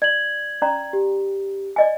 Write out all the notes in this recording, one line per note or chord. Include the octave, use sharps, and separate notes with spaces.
D5 G#6 F#7
C#4 D5 A#5
G4
D5 D#5 G#5